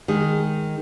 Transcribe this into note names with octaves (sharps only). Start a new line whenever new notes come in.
D#3 G#3 G#4